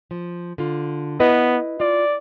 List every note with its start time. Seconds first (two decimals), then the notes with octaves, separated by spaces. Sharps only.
0.11 F3
0.58 D3 F4
1.20 B3 E4 B4 D#5
1.80 F4 D5